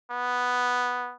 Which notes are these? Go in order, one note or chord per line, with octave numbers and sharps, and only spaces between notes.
B3